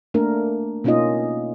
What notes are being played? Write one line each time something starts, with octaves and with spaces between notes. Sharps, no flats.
A3 A#3 D4 A#4
B2 A#3 C#4 D#4 F4 D#5